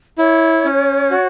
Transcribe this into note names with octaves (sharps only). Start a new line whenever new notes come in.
E4 C#5
C#4
F#4